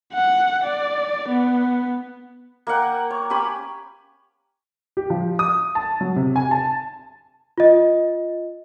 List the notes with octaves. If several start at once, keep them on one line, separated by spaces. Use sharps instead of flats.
F#5
D5
B3
A#3 A#4 F#5 G5
C#5
C#4 G4 G#5 B5
G4
F3
D#6
A5
F#3
C3
G#5
A5
F4 D#5